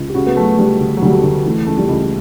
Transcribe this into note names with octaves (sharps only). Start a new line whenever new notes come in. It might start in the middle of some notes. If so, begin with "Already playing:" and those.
Already playing: C#2
G4
C#3 F#4
B3
F#3 A3
F#3 G3
D2
F#3
D2 G3
A3
D2
E3 A3
C#2 A3
G3
C#2